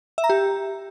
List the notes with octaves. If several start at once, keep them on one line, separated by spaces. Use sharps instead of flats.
E5
A#5
G4